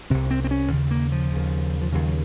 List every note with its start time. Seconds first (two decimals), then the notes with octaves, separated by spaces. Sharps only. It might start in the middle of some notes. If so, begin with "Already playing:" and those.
0.10 C2 C3 C4
0.31 C4
0.44 C4
0.51 C#4
0.72 D#2 C#3
0.91 A#3
1.12 F3
1.32 D#2 C#3
1.81 F3
1.92 D#2 C#3 F#3
2.05 F#3